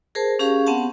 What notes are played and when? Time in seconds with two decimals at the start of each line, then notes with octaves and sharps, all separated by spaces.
0.15 G#4 A#4 C5 A5
0.39 C#4 G4 G#4 F5 C#6
0.67 B3 C4 F#5 A5